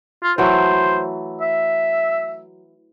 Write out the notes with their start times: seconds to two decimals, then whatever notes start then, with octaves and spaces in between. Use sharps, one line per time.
0.23 F4
0.38 E3 F#3 A3 C5
1.41 E5